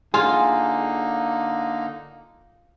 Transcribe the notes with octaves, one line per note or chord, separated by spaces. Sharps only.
D3 A#3 D#4 F4 G#4